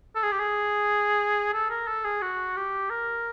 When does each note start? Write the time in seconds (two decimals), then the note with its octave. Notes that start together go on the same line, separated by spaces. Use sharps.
0.15 A4
0.23 G#4
0.32 G4
0.39 G#4
1.53 A4
1.70 A#4
1.88 A4
2.05 G#4
2.22 F#4
2.56 G4
2.90 A#4